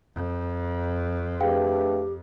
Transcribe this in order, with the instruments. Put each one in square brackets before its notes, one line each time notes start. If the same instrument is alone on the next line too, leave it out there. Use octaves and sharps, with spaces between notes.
[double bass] F2
[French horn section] A3 D4 B4 [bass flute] G4 [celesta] G#4 F5 G5